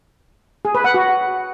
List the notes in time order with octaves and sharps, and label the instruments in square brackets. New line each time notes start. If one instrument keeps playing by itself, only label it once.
[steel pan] G#4
B4
F#5
F#4